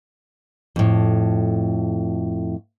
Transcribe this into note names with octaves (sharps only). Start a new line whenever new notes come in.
F2 A2